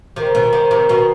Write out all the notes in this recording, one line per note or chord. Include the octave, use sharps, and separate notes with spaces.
C3 D#3
B2
C3
C3
B2